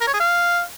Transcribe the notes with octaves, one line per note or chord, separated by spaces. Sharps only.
A#4
C#5
G#4
F5